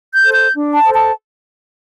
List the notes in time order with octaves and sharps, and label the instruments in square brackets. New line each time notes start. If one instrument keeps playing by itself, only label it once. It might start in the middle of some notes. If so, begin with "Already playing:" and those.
[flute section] G6
A4 C5
G6
D4
A5
A4 C5
A5